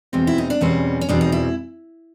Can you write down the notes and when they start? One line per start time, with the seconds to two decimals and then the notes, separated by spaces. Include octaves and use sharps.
0.13 E2 B2 G3 C4
0.27 E4
0.38 D#4
0.50 D4
0.61 E2 B2 G3 C4 C#4
1.01 C#4
1.09 E2 B2 G3 C4 D4
1.21 D#4
1.32 E4